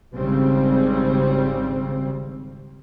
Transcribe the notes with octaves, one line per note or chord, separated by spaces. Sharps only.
G#1 C#3 G3 C4